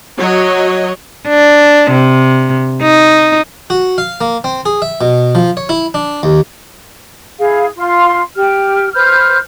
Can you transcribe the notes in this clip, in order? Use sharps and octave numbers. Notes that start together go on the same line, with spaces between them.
F#3 C#5 D#5
D4
C3
D#4
F#4
F5
A#3
C4
G#4
E5
B2
F3
C#5
E4
D4
D#2
E4 G#4 F5
F4 F5 C6
G4 F6
B4 C5 F6 G6